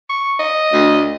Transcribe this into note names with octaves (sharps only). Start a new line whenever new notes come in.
C#6
D#5
D2